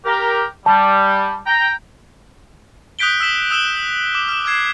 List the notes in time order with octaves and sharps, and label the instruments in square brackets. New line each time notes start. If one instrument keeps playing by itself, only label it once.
[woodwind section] G4 A#4
[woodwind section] G3 [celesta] A5
[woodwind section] G5 A#5
[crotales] D#6 F#6 G6 B6 D7 G7
E6 B6 E7 G7
D#6 E6 F#6 E7 G7
D6
F6
D6 F6 G#6 C7